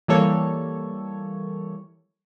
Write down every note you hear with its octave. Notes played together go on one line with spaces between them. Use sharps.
E3 G3 A#3 A4 C#5